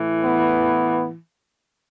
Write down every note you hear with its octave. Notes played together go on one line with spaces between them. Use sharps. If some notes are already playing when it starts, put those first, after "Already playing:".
Already playing: A2 E3
B3